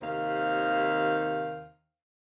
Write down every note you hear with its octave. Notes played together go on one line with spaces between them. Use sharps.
D#2 C3 D#3 C5 F5